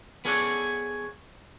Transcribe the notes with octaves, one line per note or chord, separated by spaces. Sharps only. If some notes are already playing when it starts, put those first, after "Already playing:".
B3 G#4 A4 C#5 D5 F#5